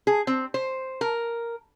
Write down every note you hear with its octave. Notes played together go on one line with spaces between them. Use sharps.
G#4
C4
C5
A#4